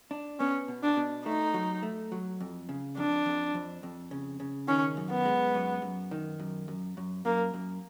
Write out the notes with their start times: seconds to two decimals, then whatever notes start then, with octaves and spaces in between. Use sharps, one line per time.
0.11 D4
0.40 B3 C#4
0.68 B2
0.83 D4
0.97 B2
1.26 A3 D#4
1.54 F#3
1.83 A3
2.12 F#3
2.40 F2
2.69 C#3
2.97 F2 D4
3.26 F2
3.54 F2
3.83 F2
4.11 C#3
4.40 C#3
4.68 D#3 C#4
4.97 F#2
5.11 B3
5.25 G#3
5.55 F#2
5.82 F#2
6.11 D#3
6.39 F#2
6.68 F#2
6.97 F#2
7.25 F#2 A#3
7.54 F#2